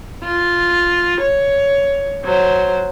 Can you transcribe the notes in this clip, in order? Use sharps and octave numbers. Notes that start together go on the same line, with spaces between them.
F4
C#5
F#3 C5